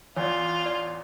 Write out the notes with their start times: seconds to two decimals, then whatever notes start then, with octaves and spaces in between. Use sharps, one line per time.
0.17 A1 E2 F4 C#5 D5
0.66 D5